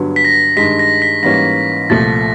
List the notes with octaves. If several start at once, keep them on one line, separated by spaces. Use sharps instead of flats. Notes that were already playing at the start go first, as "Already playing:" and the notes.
Already playing: G2 D3 F#3 B3
B6
A#6
G2 D#3 G#3 B6
A#6
B6
G#2 E3 G3 A#3 C#4 A#6
C2 A#2 F3 A3 A6